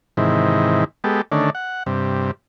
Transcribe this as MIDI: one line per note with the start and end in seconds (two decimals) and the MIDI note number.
0.17 0.84 44
0.17 0.84 48
0.17 0.84 51
0.17 0.84 52
1.04 1.21 56
1.04 1.21 59
1.04 1.21 67
1.04 1.21 69
1.32 1.50 50
1.32 1.50 51
1.32 1.50 57
1.32 1.50 61
1.32 1.50 62
1.55 1.83 78
1.86 2.31 43
1.86 2.31 48